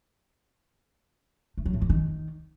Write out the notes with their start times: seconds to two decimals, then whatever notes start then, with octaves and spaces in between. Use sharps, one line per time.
1.58 A3
1.66 F#3
1.74 A2
1.82 F3
1.90 D#3